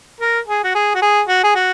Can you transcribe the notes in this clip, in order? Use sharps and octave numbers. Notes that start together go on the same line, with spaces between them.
A#4
G#4
F#4
G#4
F#4
G#4
F#4
G#4
F#4